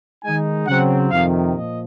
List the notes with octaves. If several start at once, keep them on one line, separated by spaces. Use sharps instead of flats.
D#3 G#3 D#4 G#5
C#3 F#3 C4 F#5
F2 C3 D#3 F5
A#2 F3 D#5